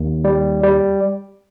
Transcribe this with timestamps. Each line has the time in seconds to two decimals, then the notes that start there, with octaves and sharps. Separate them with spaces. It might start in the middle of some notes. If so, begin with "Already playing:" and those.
Already playing: D#2
0.24 G3
0.63 G3